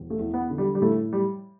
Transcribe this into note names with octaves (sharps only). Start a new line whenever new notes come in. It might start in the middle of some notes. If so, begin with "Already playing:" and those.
Already playing: E1
A3
E2
B3
D3
G3
G3
A2 A3
G3